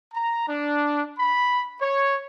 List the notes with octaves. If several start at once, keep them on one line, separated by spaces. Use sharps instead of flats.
A#5
D4
B5
C#5